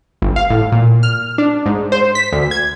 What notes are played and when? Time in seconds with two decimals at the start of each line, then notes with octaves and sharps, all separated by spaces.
0.22 G1
0.36 F5
0.50 A2
0.72 A#2
1.03 F6
1.38 D4
1.66 G#2
1.92 C5
2.15 B6
2.32 D2
2.51 G#6